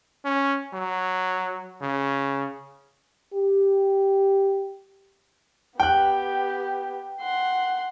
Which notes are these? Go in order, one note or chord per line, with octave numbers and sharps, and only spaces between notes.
C#4
F#3
C#3
G4
B3 G4 G5 F#6
F#5 C6